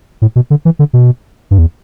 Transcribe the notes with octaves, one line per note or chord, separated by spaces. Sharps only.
A2
B2
D3
E3
D3
B2
G2
E2